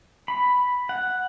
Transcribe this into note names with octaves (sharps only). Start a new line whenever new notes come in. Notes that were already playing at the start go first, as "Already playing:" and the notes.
B5
F#5